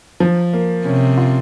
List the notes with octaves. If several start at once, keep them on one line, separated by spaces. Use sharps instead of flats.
F3
A#3
C3 C#4
F4